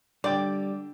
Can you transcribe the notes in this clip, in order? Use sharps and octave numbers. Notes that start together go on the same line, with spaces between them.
D3 G3 D5 G5 D6